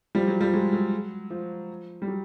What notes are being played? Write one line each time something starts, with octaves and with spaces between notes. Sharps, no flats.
F3 G3
F#3
F3 G3
F#3 G#3
F#3
F3
G3
F#3